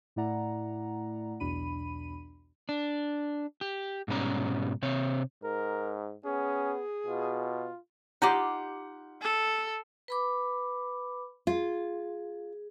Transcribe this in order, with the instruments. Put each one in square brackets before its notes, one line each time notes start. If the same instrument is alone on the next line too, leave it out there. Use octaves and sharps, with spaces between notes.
[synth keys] A2 A3 E4 D5 F#5 A#5
B1 E2 B2 D4 B5 D#7
[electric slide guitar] D4
G4
G#2 B2 G3 C#4 A#5
C3 C4 C#5
[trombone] G#2 [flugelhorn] A#4
[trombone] B3 [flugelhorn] C#4 [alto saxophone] G#4
[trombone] B2 [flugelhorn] F4
[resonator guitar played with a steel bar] D#4 F4 G4 [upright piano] F#5
[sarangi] A4
[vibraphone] B4 B5 D6
[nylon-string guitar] F4 [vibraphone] G#4